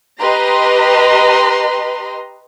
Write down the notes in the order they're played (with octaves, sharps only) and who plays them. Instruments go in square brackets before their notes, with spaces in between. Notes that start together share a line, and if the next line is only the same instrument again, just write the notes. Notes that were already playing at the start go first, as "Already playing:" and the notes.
[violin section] G4 B4 D#5 A#5 C6